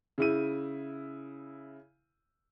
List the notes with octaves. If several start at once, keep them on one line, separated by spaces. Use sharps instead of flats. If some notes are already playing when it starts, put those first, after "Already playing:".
C#3 E4 D#7